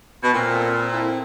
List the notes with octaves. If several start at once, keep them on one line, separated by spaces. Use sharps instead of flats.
B2
A#2 C4
A4
C4
E4